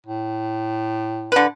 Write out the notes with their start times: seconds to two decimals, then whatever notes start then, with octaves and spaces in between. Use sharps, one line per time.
0.07 A2
1.32 D3 B4